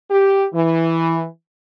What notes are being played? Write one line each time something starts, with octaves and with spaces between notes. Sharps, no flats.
G4
E3